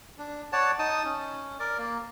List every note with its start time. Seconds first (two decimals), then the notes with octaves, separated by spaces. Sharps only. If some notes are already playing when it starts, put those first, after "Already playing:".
0.19 D4
0.53 C#5 D5 F#5 A5
0.79 D#4 A5 D#6
1.05 C#4
1.60 A#4 D5
1.78 A#3